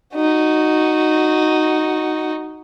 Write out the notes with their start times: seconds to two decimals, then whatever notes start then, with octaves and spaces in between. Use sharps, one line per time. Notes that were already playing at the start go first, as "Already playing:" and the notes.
0.15 D#4 F#4